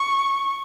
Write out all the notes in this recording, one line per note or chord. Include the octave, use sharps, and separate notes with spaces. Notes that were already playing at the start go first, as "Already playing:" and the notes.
Already playing: C#6